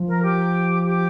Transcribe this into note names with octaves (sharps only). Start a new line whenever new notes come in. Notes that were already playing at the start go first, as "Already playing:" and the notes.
Already playing: F3
A#4
G4
G4